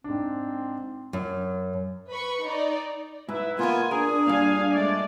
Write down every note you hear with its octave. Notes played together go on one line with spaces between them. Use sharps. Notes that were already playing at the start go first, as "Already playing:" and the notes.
G#2 C4 D4
F#2
B4 B5 C#6
D#4 D5
G#2 E4 B4 E5
A#2 A#3 B3 F4 G#5
D4 G#4 A#4
G2 A#2 F5 G#5
G#3 A3 D5